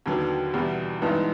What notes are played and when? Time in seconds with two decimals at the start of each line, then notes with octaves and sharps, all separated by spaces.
0.06 D#2 D3 F#3 B3
0.54 E2 B2 G3
1.02 G2 E3 G#3 B3 D#4